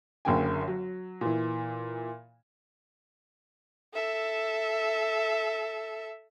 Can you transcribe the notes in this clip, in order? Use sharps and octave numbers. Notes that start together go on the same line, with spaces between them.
F#1 F#2 D3 A#3 G5 G#5
F#3
A#2 E3
A4 E5